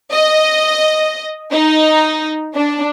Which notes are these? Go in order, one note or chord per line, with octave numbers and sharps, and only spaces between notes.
D#5
D#4
D4